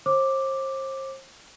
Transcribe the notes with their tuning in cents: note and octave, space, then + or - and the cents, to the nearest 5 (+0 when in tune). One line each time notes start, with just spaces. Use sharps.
C5 +40 D6 +0